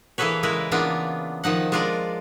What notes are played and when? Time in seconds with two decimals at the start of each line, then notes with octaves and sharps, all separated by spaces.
0.18 E3 A#3 G#4 A4 B4 C#5
0.43 C#3 G#3 E4 A#4 B4
0.72 C#3 E3 A#3 B3 D4 F4
1.44 D#3 F3 D#4 F#5
1.72 G#3 D4 F4 A#4 D5